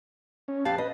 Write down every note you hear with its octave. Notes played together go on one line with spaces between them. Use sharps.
C#4
F2 G4 B4 F5 A5
B4 D#5